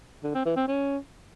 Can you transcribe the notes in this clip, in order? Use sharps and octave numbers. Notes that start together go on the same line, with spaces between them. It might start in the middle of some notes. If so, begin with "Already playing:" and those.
D3
C4
E3
C4
C#4